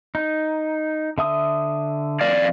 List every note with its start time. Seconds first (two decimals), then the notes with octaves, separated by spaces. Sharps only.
0.15 D#4
1.18 D3 E5 D#6
2.21 F2 D5 F5